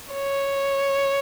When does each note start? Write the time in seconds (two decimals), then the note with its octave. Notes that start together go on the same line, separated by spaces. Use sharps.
0.14 C#5